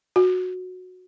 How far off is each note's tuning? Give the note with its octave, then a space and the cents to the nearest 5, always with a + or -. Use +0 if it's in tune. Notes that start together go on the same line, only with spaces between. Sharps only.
F#4 -15